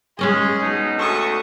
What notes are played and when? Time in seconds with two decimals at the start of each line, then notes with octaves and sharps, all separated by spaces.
0.19 G#3 C#4 G#4 D#5
0.62 B2 D#4
0.99 D2 A4 C#6 D#6